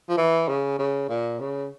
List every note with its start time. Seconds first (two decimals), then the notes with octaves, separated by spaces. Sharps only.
0.09 F3
0.17 E3
0.48 C#3
0.79 C#3
1.09 A#2
1.40 C#3